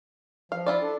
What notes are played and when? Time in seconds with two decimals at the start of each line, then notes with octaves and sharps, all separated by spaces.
0.52 F3 F5
0.66 E4 F4 D5
0.82 D4 A4